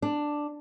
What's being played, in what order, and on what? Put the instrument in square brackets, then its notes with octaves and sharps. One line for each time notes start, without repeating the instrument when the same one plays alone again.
[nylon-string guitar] D4